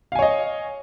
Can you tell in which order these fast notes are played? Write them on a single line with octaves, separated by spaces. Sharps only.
F5 G#5 C#5 D#5